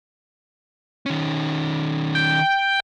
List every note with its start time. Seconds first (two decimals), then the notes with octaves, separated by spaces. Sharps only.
1.06 D#3 C#4
2.15 G5